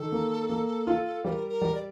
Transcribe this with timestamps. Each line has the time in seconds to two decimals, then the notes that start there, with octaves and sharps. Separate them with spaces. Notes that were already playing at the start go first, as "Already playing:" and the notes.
Already playing: D#3 A4
0.12 A#3
0.49 A#3
0.87 F4
1.24 G3 A#4 C5
1.49 A#4
1.62 G3
1.75 D5